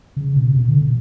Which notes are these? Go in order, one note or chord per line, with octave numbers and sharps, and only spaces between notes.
C#3
B2
C3
B2
D3
B2